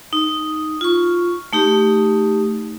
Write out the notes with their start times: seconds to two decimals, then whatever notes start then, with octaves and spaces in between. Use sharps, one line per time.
0.13 D#4
0.81 F4 C#6
1.53 A3 D#4 G4